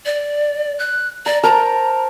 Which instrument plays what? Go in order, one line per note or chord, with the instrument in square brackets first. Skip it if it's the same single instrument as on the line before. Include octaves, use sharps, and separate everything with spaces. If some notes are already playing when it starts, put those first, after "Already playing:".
[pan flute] D5
F#6
[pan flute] D5 [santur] A#5
[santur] A#4 C5 A5 [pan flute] A#5